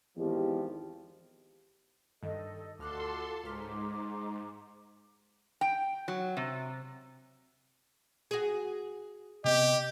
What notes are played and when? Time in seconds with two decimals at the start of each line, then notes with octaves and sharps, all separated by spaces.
0.17 G#1 E2 D#3 F3 G4
2.23 G2 D#3 A4 D#5
2.79 D2 F4 F#4 A4 C6 D6 F6 F#6
3.44 C#2 G#2 A#5 C6 D6 F6 B6
5.61 G5
6.08 F#3
6.37 C3
8.31 F#4 G#4
9.44 C3 B3 G4 D#5